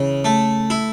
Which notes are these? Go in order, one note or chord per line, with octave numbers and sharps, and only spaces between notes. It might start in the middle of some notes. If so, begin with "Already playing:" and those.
Already playing: C#3 E3
A3
E4